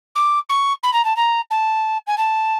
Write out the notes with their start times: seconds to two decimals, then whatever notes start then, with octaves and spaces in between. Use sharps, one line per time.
0.15 D6
0.49 C#6
0.83 B5
0.93 A#5
1.04 A5
1.16 A#5
1.50 A5
2.07 G#5
2.17 A5